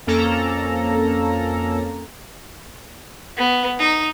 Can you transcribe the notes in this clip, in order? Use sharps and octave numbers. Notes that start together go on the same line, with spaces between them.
F2 A#3 C#4 A4 A#5
B3
D#4